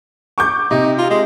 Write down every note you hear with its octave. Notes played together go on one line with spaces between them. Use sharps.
C#6 D6 G6
C3 D#4
F4
G#3